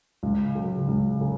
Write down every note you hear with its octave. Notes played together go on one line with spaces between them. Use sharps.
C#2
C#3 F#3
C#2
C#3